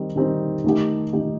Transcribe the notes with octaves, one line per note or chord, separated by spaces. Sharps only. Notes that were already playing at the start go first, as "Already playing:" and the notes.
Already playing: D#3 G3 C4 D#4
D#3 G3 C4 D#4
D#3 A3 D#4 G4
D#3 A3 D#4 G4